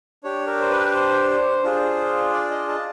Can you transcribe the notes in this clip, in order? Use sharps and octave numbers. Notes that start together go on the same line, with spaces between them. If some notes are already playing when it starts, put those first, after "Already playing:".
D4 G4 C#5
A#4
C5
B4
C5
D4 F4 G#4
D5
D#5
A5